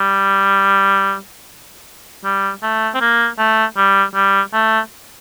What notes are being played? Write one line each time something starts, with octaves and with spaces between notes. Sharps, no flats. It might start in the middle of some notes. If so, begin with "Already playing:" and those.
Already playing: G3
G3
A3
C4
A#3
A3
G3
G3
A3